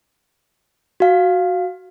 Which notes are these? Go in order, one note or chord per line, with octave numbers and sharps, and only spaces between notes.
F#4 F5